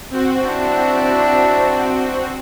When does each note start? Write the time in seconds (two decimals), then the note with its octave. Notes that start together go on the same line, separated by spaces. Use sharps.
0.10 C4 F#4
0.45 D4 E4